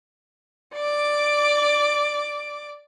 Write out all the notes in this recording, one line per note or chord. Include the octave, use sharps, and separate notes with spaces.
D5 D6